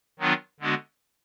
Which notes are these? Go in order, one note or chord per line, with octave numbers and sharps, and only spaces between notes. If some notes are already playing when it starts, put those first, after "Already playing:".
D#3 F#3 B3 D4 F4
D3 G#3 B3 D4 F#4